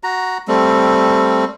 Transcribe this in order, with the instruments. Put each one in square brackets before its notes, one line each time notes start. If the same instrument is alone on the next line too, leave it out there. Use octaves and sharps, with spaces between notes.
[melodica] F#4 A#5
G3 A3 C4